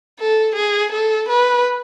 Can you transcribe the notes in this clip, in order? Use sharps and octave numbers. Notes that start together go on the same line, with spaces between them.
A4
G#4
A4
B4